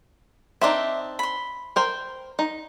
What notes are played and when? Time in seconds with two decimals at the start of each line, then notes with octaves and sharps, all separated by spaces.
0.61 C4 D4 D#4 E5 C6 D6
1.19 B5 C6
1.76 A#4 C5 G5
2.39 D#4